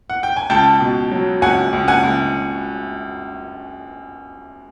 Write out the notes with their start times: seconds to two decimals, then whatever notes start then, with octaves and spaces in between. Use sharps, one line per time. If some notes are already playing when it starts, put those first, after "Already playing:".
0.10 F#5
0.23 G5
0.37 G#5
0.50 C#2 G5 A5
0.80 B2
1.11 F#3
1.42 C#2 F#5 G#5
1.73 C#2
1.88 F#5 G#5
2.03 C#2